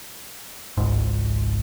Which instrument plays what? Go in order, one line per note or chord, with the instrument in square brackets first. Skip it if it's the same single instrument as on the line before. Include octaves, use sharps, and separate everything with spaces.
[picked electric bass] G#1 C#2 G#2